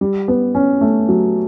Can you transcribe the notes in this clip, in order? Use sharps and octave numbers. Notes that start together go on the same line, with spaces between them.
G3
B3
C#4
A3
F#3